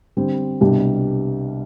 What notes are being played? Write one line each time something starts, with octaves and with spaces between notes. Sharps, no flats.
D3 G3 C4
C2 B2 G3 D4 G4